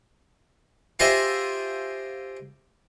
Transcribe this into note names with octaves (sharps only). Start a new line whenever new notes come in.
F4 G4 G#4 C5 D#5 E5